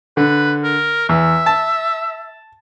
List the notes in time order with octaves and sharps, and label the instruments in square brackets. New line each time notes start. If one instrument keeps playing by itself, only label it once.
[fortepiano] D3 [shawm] B4
[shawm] A#4
[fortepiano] E2 [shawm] E5
[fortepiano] A5